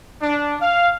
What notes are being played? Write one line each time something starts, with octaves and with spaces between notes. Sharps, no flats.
D4
F5